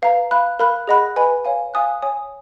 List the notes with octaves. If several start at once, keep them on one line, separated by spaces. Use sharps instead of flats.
B4 F5 A#5
F5 B5 F#6
A#4 F5 B5 F#6
G#4 D#5 F#5 B5 F#6
B4 D#5 G#5 B5
C#5 F5 G#5
F5 G#5 D#6 F#6
C#5 G#5 D#6